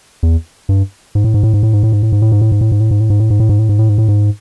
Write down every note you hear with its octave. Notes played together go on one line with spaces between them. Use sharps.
E2
G2
G#2
A2
G#2
A2
G#2
A2
G#2
A2
G#2
A2
G#2
A2
G#2
A2
G#2
A2
G#2
A2
G#2
A2
G#2
A2
G#2
A2
G#2
A2
G#2
A2
G#2
A2
G#2